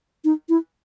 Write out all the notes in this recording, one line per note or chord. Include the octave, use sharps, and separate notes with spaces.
D#4
E4